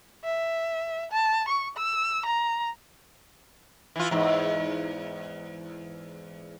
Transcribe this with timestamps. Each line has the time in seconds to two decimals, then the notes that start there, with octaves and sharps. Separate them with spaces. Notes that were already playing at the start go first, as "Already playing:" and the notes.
0.24 E5
1.12 A5
1.48 C#6
1.77 E6
2.25 A#5
3.96 E3 F4
4.11 E2 G#2